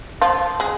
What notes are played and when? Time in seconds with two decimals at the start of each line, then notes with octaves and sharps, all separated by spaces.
0.21 F3 F4
0.60 G#3 G#4